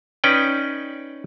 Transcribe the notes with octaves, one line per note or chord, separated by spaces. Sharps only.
C#4 D#4 B4 D5 G5